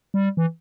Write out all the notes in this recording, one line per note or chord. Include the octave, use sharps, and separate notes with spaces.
G3
E3